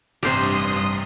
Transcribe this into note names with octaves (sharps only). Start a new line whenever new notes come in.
A1 G2 C3 G4 C5 C6 D#6